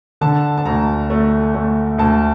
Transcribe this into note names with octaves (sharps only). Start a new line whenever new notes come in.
D3 A5
A5
D2 A#5
A3
A3
D2 A5